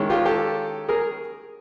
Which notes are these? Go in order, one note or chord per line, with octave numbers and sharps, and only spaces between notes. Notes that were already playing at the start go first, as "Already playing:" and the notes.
Already playing: D#3 G#3 C#4 E4
F4 G4
G4 A4
G#4 A#4